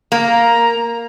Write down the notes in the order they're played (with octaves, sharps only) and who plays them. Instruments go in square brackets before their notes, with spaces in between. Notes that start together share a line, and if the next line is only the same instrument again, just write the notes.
[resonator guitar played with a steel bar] A#3 [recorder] A#5